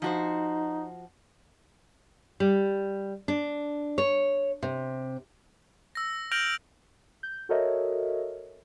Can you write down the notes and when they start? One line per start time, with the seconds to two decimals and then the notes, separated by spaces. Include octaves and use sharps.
0.02 F3 D#4 F#4 C5
2.40 G3
3.28 D4
3.98 C#5
4.62 C3
5.95 E6 A#6
6.32 F6 G6 A#6 D7 F7 F#7
7.23 G6
7.49 F#4 A4 A#4 C#5 D#5 E5